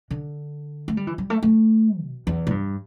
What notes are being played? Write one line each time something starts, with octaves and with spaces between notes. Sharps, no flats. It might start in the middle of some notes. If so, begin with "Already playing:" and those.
D3
A3
G3
E3
G3
A3
A3
B2
E2
A2
G2